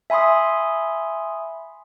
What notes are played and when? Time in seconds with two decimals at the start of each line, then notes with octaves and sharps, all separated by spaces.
0.10 E5 G#5 B5 C6 D#6